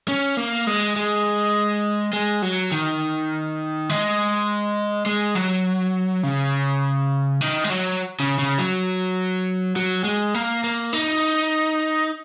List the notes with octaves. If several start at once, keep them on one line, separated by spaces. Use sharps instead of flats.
C#4
A#3
G#3
G#3
G#3
F#3
D#3
G#3
G#3
F#3
C#3
D#3
G#3
F#3
C#3
C#3
F#3
F#3
G#3
A#3
A#3
D#4